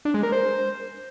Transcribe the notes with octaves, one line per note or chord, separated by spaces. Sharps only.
D4
G#3
A#4
C5